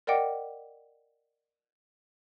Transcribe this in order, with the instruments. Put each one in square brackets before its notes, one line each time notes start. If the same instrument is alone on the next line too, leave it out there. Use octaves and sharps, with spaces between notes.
[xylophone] A#4 D5 D#5 F#5 G5 D6